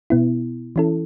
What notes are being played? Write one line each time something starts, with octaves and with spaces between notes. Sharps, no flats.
B2 B3 E4
E3 C#4 E4 A4